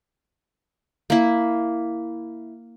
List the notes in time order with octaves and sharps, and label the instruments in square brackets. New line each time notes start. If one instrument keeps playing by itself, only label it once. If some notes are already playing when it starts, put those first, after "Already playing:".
[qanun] A#3 E4